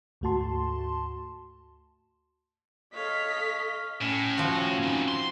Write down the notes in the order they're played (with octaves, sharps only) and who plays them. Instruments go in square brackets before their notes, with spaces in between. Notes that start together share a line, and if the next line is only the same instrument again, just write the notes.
[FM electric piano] D2 G#2 A3 F#4 A5 C6
[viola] A4 F5 [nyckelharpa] C#5 [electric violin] D#5 B6 [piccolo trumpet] F6
[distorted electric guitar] A2 [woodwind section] C#4
[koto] F3 F#4
[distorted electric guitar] C4 D#4
C6